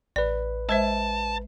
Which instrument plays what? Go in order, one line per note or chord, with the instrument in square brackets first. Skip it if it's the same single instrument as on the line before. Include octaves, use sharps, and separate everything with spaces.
[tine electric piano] A1 B4 [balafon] D5
[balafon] G#3 C5 E5 [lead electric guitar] A5